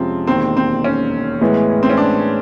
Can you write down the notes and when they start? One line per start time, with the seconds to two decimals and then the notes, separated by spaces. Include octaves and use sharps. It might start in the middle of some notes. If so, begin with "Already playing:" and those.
Already playing: F2 C3 F3 G#3 C4 C#4
0.27 E1 D#2 D#3 C4
0.57 C4
0.84 C#4
1.41 A2 E3 G#3 B3
1.83 C4
1.90 C#4
1.97 D4